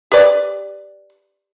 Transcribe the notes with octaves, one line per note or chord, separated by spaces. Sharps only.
G4 B4 D5